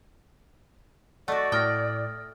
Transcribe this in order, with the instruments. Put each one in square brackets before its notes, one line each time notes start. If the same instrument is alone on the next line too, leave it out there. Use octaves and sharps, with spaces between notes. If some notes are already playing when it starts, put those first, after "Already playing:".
[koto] A3 F#4 [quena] D5 [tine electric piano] D#5 F#5
[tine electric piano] A2 [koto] G5 [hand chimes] D#6 F6 A#6